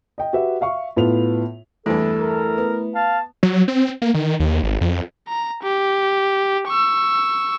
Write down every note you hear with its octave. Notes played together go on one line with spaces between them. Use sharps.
D#5 G5
F#4 G4 B4 E5
E5 F5 C#6
A2 B3 F4 B4 F7
E2 G2 E3 A3 E4 A4
A#4
B3
F5 A5
F#3
C4
A#3
D#3
D#2
G#1
F2
A#5
G4
C#6 E6